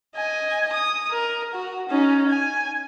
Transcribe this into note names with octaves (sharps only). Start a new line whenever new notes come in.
D#5 G#5
D#6
A#4
F#4
C#4 D#4
G#5